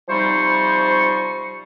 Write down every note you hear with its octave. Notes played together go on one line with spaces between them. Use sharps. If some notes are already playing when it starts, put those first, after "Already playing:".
C3 F3 G3 D#4 C5 C#6